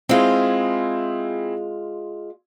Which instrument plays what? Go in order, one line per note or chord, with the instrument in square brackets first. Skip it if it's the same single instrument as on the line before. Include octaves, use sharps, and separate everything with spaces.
[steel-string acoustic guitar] G#3 F4 [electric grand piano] C4 E4 G#4